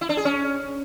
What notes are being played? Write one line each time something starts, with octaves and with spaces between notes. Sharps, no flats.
E4
D4
G#4
C#4